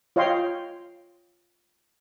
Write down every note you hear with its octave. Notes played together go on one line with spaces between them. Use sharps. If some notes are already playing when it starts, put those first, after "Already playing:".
F4 C#5 D#5 F5 G5 C6